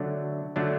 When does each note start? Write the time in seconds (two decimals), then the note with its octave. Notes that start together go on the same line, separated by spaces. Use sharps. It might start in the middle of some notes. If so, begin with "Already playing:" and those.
Already playing: D3 F#3 A3 D4
0.56 D3 F#3 A3 D4